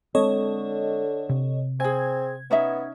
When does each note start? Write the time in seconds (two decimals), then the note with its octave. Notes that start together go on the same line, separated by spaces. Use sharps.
0.15 D3 G#3 C4 A4 C#5 D#5
1.29 C3
1.80 C4 G#4 G#5 G#6
2.51 B3 C#4 D#4 E5